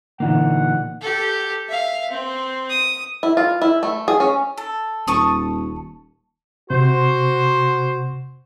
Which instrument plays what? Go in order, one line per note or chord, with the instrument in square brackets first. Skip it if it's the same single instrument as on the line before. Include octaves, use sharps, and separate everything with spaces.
[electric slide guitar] A#2 E3 A#3 [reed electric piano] D3 D#4 [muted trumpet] F#5
[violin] G4 A4
E5 F5
C4
D#6
[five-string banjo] E4
F4
E4
A3
G#4
C#4
[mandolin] A4
[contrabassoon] D#1 [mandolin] A5 C#6 D#6
[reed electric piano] C3 [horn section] F#4 C5